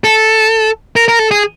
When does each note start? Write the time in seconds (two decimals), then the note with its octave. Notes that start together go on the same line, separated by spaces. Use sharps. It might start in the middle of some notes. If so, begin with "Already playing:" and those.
0.04 A4
0.96 A#4
1.08 A#4
1.19 A4
1.31 G#4